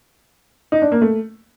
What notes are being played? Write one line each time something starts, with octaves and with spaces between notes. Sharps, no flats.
D#4
D4
A#3
A3